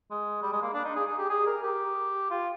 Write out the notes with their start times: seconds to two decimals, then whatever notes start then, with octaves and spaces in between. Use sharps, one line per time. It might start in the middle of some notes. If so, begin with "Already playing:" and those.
0.11 G#3
0.42 G3
0.52 G#3
0.62 A#3
0.73 D4
0.84 D#4
0.96 G#4
1.07 G#4
1.18 G4
1.29 G#4
1.46 A#4
1.63 G4
2.31 F4